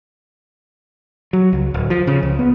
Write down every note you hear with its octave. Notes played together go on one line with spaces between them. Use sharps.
F#3
C#2
D1
F3
C#3
C#2
B3